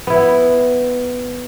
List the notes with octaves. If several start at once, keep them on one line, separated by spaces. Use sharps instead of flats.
B3 E4